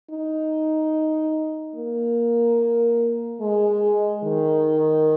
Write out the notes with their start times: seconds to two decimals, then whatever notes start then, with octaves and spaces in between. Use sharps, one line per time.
0.10 D#4
1.76 A#3
3.41 G#3
4.24 D#3